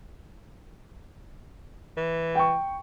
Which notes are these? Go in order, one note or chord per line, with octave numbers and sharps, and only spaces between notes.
E3
G5 C#6